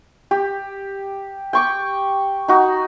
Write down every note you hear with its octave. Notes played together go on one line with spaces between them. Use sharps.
G4
G5 C#6 D6
D#4 F#4